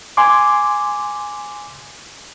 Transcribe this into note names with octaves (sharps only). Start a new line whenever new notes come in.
G#5 C6 D6